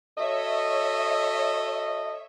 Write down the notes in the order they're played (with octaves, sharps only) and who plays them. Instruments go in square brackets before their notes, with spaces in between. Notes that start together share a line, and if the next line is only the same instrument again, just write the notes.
[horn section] F#4 A4 D#5 [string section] C#5 E5